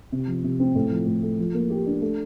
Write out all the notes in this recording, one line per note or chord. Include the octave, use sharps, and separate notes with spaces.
C3
F3
C3
C4
A2
F3
A2
A3
F3
A#3
G4
D4
A3